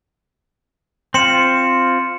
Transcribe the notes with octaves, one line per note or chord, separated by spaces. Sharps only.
C4 F4 C6 C#7 E7